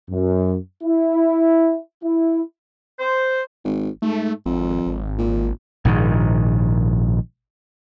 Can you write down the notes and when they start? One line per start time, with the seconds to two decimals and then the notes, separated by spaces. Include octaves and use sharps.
0.10 F#2
0.83 E4
2.04 E4
2.99 C5
3.64 G#1
4.02 G#2 A3
4.46 G#1 F2
4.86 G#1
5.18 A#2
5.85 A#1 G#2 D#3